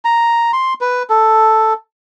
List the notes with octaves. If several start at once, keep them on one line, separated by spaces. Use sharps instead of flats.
A#5
C6
B4
A4